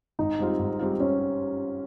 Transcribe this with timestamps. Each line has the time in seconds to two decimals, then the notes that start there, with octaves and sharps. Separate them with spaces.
0.19 G#1 D#4
0.39 G#2 G3 C4 F4
0.59 G#1
0.79 G#2 G3 C4 F4
1.00 C#4